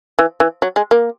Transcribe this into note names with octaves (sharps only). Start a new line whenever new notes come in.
E3
E3
F#3
G#3
A#3